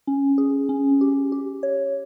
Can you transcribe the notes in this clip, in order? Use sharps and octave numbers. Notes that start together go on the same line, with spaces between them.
C#4
G#4
C#4
G4
G4
C#5